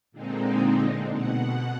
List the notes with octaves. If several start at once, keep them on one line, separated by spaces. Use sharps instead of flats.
A#2 D3 G#3 C4 D#4
B2 F#5